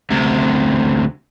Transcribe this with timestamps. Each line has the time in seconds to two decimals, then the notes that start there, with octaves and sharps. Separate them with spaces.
0.10 D2 C3